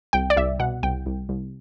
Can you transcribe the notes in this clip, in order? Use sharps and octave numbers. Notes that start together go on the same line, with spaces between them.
C2 G5
D5
C2 E5
B2 F#5
C2 G5
C2
C2